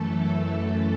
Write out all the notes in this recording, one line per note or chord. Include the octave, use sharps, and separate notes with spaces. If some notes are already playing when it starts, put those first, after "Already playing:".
Already playing: F#2 E3 A3 A4